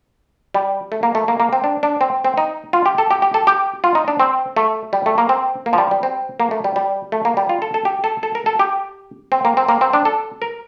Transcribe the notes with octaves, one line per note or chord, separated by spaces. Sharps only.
G3
A3
A#3
A3
A#3
A#3
C4
D4
D4
C4
C4
D#4
F4
G4
A4
G4
G4
A4
G4
F4
D#4
D4
C4
A3
G3
A3
A#3
C4
A#3
F3
G3
G3
C4
A#3
A3
G3
G3
A3
A#3
G3
F4
A4
A4
G4
A4
A4
A#4
A4
G4
C4
A#3
C4
A#3
C4
D4
A4
A#4